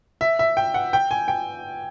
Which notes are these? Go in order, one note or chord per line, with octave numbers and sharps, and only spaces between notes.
E5
E5
G5
F#5
G5
G#5
G5